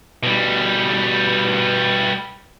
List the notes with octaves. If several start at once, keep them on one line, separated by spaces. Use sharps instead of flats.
B2 G3